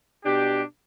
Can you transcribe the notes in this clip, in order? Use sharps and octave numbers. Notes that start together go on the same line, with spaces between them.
B2 D4 G4